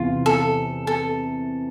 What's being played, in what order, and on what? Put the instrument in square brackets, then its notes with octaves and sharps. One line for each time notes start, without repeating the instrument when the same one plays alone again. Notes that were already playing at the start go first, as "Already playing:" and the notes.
Already playing: [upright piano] E2 C3 E3 [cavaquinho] F4
[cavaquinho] A4
A4